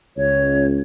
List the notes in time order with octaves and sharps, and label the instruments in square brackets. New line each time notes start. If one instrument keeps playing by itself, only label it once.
[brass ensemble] C#2 [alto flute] C#5